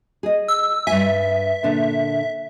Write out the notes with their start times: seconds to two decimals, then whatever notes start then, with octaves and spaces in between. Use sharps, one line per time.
0.23 G#4 D#5
0.48 E6
0.87 G2 E5 G#5
1.63 A#2 D3 D4